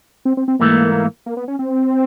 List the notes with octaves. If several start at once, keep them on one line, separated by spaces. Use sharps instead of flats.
C4
C4
C4
G#2 E3 A3 A#3
A#3
B3
C#4
C4